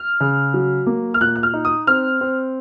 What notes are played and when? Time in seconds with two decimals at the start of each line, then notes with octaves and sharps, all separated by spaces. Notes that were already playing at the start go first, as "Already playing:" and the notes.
Already playing: F6
0.21 C#3
0.54 F#3
0.87 A#3
1.14 F6
1.21 A#2 F#6
1.36 F#6
1.43 F6
1.54 D#4
1.65 D#6
1.87 C4 F6
2.21 C4